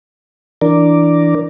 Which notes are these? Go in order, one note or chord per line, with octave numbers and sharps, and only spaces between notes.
E3 D4 A#4 D5